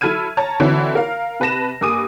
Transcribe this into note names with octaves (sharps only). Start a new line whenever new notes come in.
F#3 E4 A4 F6 G#6 D#7
C#5 A5 A#5
D3 E3 C4 E4 F#4 C#5
A#4 F5
C3 B4 A5 A#6 E7
G2 A#3 G#5 D6 D#6 D#7